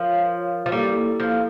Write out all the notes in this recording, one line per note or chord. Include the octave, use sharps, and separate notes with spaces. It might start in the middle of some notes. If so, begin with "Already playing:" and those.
Already playing: F3 F4 A#4 C#5 F5
F3
G3 A#3 E4 A4
F3